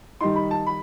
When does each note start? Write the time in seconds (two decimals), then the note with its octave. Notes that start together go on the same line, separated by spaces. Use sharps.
0.21 D#3 G3 D#4 C6
0.36 B5
0.51 A5
0.66 B5